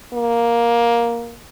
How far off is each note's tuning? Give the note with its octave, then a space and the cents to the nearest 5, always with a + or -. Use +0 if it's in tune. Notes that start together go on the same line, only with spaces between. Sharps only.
A#3 +10